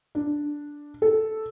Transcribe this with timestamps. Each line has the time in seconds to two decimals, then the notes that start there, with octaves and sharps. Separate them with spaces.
0.15 D4
1.02 A4